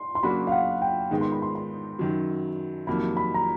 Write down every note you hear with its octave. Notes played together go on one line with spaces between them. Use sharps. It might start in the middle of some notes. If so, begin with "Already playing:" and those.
Already playing: C6
C6
C#3 F#3 A#3 D4 F#4 B5
F5
F#5
G5
G#2 D#3 G#3 B3 D#4
C6
B5
C6
C6
F#2 D#3 F#3
F2 C3 D#3 F#3 A#3 B5
B5
A#5